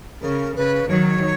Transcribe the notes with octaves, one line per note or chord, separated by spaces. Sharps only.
C#3 A#4
C#3 B4
D#3 F#3 C#5